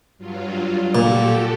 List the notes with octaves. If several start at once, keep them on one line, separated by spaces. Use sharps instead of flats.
G2 F#3 F4
A#2 F#4 G4 A4